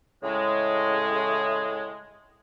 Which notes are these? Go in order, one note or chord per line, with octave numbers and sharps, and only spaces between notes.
A2 C#3 G#3